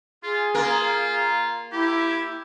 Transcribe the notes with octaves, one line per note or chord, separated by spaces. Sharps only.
F4 G#4
A#3 F4 A#4
E4 G4